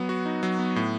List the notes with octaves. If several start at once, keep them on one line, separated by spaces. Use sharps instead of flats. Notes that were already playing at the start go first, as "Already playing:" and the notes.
Already playing: F#3 B3
F#4
D#4
F#3
B3
A2